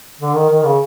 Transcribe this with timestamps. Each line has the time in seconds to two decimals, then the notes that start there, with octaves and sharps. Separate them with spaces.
0.20 D3
0.36 D#3
0.50 D#3
0.65 C#3